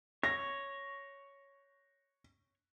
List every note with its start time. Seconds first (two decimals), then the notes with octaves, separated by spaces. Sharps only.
0.23 C#5 A#6